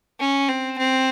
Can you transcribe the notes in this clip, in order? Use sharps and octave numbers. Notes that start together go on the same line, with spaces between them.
C#4
C4
C4